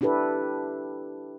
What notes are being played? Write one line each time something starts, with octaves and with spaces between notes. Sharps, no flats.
D4 E4 G4 A4 B4